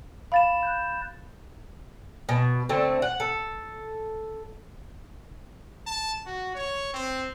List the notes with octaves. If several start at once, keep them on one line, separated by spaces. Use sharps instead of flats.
F5 B5 A6 E7
F#6 G6
B2
D3 A3 C4
F#5
A4
A5
F#4
C#5
C4